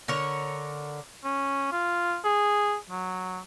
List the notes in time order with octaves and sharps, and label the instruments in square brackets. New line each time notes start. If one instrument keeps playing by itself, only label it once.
[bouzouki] D3 A#4 C#5
[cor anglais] C#4
F4
G#4
F#3